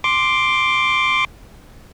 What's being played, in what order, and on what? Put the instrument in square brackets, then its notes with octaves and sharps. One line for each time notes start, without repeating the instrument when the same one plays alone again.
[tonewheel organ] C6 D6